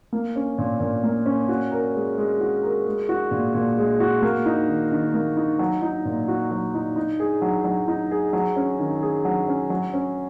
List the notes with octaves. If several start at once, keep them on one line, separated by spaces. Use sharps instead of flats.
A#3
C#4
A#2
A#2
A#3
C#4
F#4
A#4
G#3
G#3
F#4
A#4
G#3
F#4
A#2
A#2
G#3
F#4
A#3
D#4
D#3
D#3
A#3
D#4
F#3
D#4
A#2
F#4
F#3
D#4
D#4
G#4
F#3
F#3
D#4
G#4
F#3
C#4
D#3
G#4
F#3
C#4
F#3
C#4